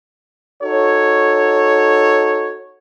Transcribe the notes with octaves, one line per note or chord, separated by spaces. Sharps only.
D#4 F#4 A4 C#5